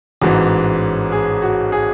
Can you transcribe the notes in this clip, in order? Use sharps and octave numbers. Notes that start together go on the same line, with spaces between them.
A1 G#2 E3 F#4
G#4
F#4
G#4